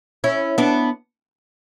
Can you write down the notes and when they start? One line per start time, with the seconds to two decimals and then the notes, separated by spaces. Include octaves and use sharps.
0.24 C#4 E4
0.58 B3 D4